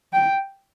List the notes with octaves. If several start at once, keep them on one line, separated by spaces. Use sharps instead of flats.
G5